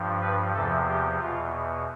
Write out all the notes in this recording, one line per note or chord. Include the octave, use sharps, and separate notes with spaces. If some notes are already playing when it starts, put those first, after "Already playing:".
Already playing: G2 F3
B4
E2 C3 F3 A4
G4
E2 B2 F4